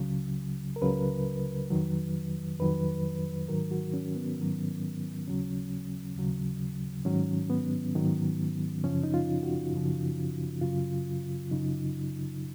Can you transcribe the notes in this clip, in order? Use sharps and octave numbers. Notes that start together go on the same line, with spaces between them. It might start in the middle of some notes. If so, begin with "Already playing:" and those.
Already playing: C#2 C#3 F#3
A#4
C#2 C#3 F#3 B4
F2 D#3 F#3
F2 D#3 F#3 B4
G#2 D#3 F#3 A#4
F#4
C#4
B3
G#2 D#3 F#3
D#2 C#3 F#3 C#4
D#2 C#3 F#3
G#2 D#3 F#3 C#4
B3
G#2 D#3 F#3
F#2 C#3 F3 C#4
D#4
F4
F#4
F#2 C#3 F3
F#2 C#3 F#3 F4
F#2 C#3 F#3 D#4